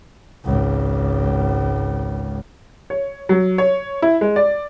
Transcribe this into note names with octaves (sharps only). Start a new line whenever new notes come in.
G#1 C#2
C#5
F#3
C#5
E4
G#3
D5